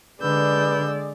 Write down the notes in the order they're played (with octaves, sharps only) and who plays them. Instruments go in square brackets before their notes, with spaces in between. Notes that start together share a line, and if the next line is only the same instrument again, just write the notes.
[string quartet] D3 [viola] G#3 D5 [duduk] B4 [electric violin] E6 G6